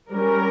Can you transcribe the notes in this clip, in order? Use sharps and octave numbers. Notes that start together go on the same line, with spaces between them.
G3 C#4 A#4